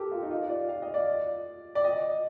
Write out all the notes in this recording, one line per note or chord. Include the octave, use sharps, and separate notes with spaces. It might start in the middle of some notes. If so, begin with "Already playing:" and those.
Already playing: G4 A4 A#4
F4
D#4
F4
D5
F5
D#5
D5
D5
D#5